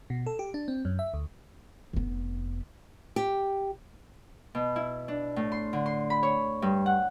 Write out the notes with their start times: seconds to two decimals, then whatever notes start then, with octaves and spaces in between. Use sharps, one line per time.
0.10 B2
0.26 A4
0.39 G4
0.54 D4
0.68 C4
0.85 F#2
0.99 E5
1.14 D2
1.93 F1 B3
3.16 G4
4.55 B2
4.76 E4
5.08 D4
5.36 A2
5.52 C6
5.73 D3
5.86 C6
6.10 B5
6.23 C#5
6.62 G2
6.86 F#5